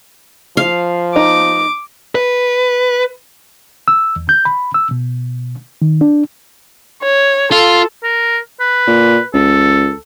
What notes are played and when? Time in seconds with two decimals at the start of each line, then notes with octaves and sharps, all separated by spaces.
0.57 F3 F5
1.16 D#4 D6
2.15 B4
3.88 E6
4.16 E2
4.29 G6
4.45 B5
4.74 E6
4.91 B2
5.82 D#3
6.01 D4
7.02 C#5
7.52 F4 A4
8.03 A#4
8.60 B4
8.87 A#2
9.34 C#2 A4